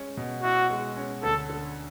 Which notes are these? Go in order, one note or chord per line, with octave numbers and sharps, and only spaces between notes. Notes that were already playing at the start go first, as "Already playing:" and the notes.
Already playing: G#3 C#4
B2
E4 F#4
G#3
C#4
D2 A4
D3